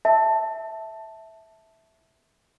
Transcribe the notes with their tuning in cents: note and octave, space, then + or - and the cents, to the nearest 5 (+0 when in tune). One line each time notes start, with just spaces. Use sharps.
E5 -10 A5 +0